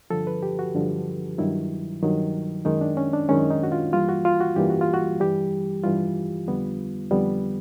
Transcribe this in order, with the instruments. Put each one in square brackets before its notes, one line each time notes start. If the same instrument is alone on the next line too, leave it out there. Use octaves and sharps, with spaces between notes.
[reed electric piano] G2 D3 F3 A4
B4
G4
F#4
G2 D3 F3
G2 D#3 F#3 E4
G2 D#3 F#3
F#2 D#3 G#3 D#4
D4
C#4
D4
F#2 D#3 G#3 C#4
D#4
F#4
F4
G2 E3 G3 A#3 F4
F#4
F4
F#4
G2 E3 G3 A#3 G4
F#4
F4
F#4
G2 E3 G3 G4
G2 E3 G3 F4
F2 D3 G3 B3
F2 D3 G3 B3